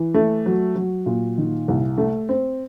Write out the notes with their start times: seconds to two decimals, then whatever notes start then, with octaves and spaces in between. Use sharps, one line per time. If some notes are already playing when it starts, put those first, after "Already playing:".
Already playing: E3
0.14 A3
0.46 F#3
0.76 F#3
1.06 A#2
1.38 D#3
1.68 C2
1.98 A3
2.29 C4